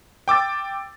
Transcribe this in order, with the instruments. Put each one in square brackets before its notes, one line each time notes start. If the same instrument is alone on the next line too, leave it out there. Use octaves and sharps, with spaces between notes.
[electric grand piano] G5 D6 E6 A6